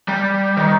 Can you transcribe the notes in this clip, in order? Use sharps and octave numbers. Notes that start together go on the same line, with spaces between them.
G3
D#3